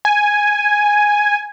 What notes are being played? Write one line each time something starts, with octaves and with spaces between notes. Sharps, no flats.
G#5